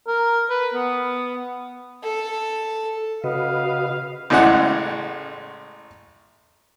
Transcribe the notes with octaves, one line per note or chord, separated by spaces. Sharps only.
A#4
B4
B3
A4
C#3 F#4 B4 D#5 F5
A1 A2 C#3 G#3 D5 F#5